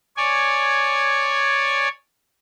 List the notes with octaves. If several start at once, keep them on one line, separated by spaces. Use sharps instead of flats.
C#5 D5 G#5